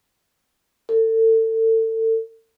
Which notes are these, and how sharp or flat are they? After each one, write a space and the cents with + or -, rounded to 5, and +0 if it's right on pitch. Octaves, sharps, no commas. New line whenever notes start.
A4 +30